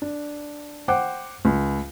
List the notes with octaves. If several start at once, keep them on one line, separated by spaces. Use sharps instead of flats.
D4
C5 F#5 G5 D6
C#2